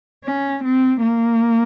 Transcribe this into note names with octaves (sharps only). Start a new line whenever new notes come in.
C#4
C4
A#3